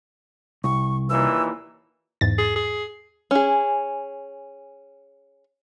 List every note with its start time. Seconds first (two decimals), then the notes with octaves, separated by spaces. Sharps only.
0.64 C2 C#6
1.10 D#2 A#2 E3 E6
2.21 E2 G#2 A6
2.38 G#4
2.56 G#4
3.31 C#4 G#4